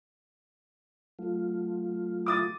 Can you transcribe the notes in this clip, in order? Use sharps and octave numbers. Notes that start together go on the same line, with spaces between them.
F#3 A3 F4
D6 D#6 A6